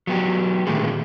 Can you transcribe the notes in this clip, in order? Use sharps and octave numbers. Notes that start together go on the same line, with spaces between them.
F#3 B3 G4
A#2 D3 D#3 A3 G4 G#4